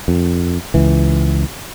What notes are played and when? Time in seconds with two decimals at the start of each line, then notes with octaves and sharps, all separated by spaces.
0.08 F2
0.74 C#2 E3